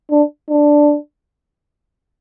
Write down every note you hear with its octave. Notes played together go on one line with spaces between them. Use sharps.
D4
D4